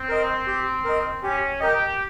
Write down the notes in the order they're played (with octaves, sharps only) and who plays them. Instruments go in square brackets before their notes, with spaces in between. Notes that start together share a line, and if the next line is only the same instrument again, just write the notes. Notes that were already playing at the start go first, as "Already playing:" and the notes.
Already playing: [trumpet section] C4
[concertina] A#4 D#5
G4
A#4 D#5
[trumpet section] C#4 [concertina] G4
[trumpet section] G4 [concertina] A#4 D#5